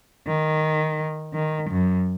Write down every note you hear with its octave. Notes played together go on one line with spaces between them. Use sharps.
D#3
D#3
F#2